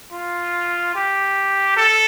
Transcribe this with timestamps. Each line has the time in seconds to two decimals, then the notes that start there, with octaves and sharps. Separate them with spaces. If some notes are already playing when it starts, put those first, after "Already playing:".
0.12 F4
0.95 G4
1.77 A4